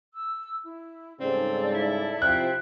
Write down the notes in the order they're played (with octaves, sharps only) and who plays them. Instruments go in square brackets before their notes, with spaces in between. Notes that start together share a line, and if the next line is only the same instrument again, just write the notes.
[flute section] E6
E4
[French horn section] G#2 C#3 G3 [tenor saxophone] C4 [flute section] A4 D5
[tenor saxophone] E4
[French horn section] C3 F3 [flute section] F4 C5 G5 [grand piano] F#6